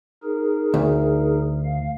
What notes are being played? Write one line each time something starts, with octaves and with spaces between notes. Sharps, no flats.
D#4 G#4 A#4
D2
F5